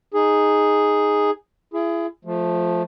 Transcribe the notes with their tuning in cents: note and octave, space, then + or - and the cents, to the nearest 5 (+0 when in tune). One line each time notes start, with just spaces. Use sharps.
D#4 +0 G#4 +0
E4 +35 G#4 +0
F3 +5 A3 -15